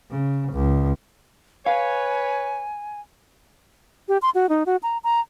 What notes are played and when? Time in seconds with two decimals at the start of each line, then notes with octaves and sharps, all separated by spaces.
0.11 C#3
0.53 C#2
1.66 B4 C#5 F5 G#5
4.08 G4
4.22 C6
4.35 F#4
4.49 D#4
4.66 F#4
4.83 A#5
5.04 A#5